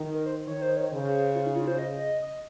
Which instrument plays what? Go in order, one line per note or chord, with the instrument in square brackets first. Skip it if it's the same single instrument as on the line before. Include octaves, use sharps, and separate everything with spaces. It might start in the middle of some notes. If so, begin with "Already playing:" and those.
Already playing: [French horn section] D#3
[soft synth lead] A#4
C5
[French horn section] D#3 [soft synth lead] C#5
[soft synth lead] C5
C#5
[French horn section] C#3 [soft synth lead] C5
[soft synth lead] F4
D#4
F4
C5
D#5
D#5